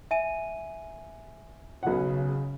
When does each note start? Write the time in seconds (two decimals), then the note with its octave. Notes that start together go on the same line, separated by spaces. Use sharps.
0.11 E5 G#5 D#7
1.83 B1 C#3 F#5